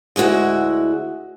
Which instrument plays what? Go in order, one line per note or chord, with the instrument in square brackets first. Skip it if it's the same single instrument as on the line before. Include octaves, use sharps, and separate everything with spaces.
[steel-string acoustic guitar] D2 G#3 E4 F#4 E5